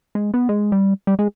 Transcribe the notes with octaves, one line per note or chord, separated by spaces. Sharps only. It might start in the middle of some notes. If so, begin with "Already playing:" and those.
G#3
B3
G#3
G3
G3
G#3